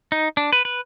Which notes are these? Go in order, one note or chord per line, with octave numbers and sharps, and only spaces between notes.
D#4
D4
B4
B4